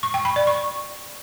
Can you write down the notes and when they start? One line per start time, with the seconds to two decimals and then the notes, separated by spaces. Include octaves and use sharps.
0.03 C#6
0.14 G5
0.25 B5
0.36 D5
0.47 C#6